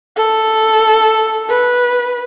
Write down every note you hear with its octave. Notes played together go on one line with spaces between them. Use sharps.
A4
B4